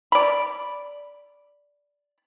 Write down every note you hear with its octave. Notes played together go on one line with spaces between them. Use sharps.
D5 B5